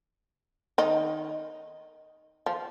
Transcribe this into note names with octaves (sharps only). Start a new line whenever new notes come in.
D#3 D#4
F3